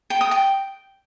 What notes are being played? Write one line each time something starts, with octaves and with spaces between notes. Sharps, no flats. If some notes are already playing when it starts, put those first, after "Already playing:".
G5
D#6
G5